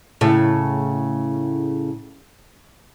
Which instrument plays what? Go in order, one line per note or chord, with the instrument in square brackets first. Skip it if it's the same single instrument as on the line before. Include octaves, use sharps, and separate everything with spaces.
[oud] A2 C#3